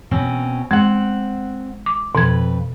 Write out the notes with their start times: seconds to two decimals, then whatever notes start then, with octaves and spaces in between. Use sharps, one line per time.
0.11 B2 C4 C#4
0.71 G#3 C4 F#5
1.86 D6
2.15 F2 B2 B4 G#6